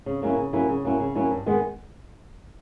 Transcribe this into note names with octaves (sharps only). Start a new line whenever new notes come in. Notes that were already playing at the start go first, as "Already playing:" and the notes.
C#3
F#3 A#3 C#4 E4
C#3
F#3 A#3 C#4 E4
C#3
F#3 A#3 C#4 E4
C#3
F#3 A#3 C#4 E4
G2
D#3 G#3 B3